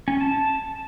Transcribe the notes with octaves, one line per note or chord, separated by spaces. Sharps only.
C#4
A5